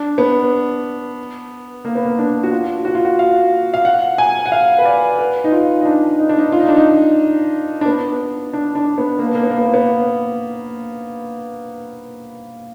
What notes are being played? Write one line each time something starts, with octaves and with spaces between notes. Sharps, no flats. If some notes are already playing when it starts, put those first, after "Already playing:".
Already playing: D4
B3
A#3
B3
A#3
D4
F#4
F4
F#4
F4
F#4
F5
F5
F#5
G#5
F#5
F5
B4
D5
B4
D#4
F4
D#4
D4
D#4
D4
D#4
F4
D#4
D4
D#4
D4
B3
D4
D4
B3
A#3
B3
A#3
B3
A#3
B3
A#3
B3